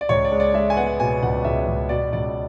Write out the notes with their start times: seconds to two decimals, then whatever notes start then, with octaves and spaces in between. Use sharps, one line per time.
0.01 D5
0.09 C#2 C#5
0.25 D5
0.32 G#3
0.40 D5
0.54 G#3 E5
0.70 G#5
0.76 B3 F#5
1.00 B2 G#5
1.22 C#2 F#5
1.44 C#2 E5
1.67 C#2
1.89 B2 D5
2.13 C#2 D5